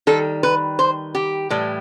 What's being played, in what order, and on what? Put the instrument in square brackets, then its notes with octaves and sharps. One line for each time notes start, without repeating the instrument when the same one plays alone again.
[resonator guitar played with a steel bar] D#3 G3 A4
B4
C5
G4
A2 E3 G3